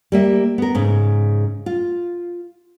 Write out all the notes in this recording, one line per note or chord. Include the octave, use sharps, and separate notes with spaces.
G3 A#3 E5
B3 A#4
G#2 C#3
F4